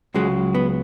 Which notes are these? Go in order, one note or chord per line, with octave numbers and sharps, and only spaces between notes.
C#2 C#3 F#3 G#3
B3